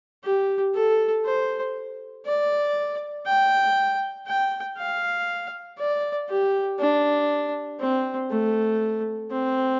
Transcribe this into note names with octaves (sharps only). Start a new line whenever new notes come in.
G4
A4
C5
D5
G5
G5
F5
D5
G4
D4
C4
A3
C4